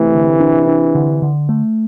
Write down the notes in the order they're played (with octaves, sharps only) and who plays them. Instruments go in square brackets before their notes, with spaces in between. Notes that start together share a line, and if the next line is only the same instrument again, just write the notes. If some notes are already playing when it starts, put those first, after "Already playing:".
Already playing: [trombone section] C3 E3 [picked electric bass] A3
[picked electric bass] D3
D4
D4
D3
D3
A3